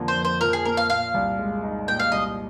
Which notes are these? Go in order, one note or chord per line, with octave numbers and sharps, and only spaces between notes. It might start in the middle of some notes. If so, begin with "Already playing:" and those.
Already playing: F2 D3 F3 A#3
C5
F2
C5
F3 A#4
G#4
A#3 A#4
F5
A#2 F5
C2
G#3
D#4
A#2 G5
F5
C2 D#5